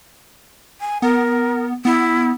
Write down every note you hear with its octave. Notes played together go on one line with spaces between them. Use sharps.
G#5
B3 A#4
B3 E4